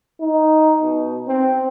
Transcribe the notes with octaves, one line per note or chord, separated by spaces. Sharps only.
D#4
B2
C4